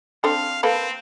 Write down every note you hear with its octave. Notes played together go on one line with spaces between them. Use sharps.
C4 D4 A4 F5
A#3 C4 A4 B4